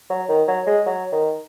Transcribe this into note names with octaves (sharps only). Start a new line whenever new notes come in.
F#3
D#3
F#3
G#3
F#3
D#3